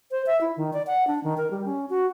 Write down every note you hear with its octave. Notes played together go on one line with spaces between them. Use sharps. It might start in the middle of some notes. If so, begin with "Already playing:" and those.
C5
E5
E4
D#3
D5
F#5
D4
D#3
A#4
G3
C#4
F#4